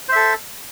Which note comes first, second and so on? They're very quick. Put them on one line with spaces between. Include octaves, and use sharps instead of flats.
C5 E5 A4